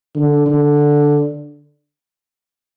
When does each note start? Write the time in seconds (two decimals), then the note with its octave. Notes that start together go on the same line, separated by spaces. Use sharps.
0.15 D3
0.46 D3